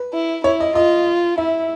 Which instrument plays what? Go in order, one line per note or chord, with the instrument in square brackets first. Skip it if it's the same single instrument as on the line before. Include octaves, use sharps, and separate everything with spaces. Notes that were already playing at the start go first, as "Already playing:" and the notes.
Already playing: [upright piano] B4
[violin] E4
[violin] E4 [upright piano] C#5
[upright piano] D#5
[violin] F4 [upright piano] D#5
[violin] E4 [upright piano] E5